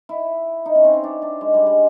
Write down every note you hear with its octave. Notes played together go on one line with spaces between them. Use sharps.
E4
D#4
C#4
C4
C#4
D4
D4
G#3
G3
G#3